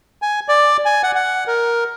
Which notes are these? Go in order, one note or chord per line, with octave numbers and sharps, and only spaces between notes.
G#5
D5
G#5
F#5
F#5
A#4